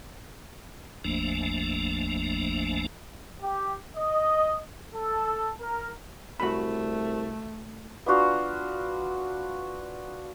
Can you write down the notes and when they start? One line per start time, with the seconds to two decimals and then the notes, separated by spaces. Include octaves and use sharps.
1.04 G#1 E2 F3 A3 A#3 D4
3.42 G4
3.96 D#5
4.95 A4
5.61 A#4
6.40 C2 A3 F#4 B5
8.06 B3 D4 F4 F#4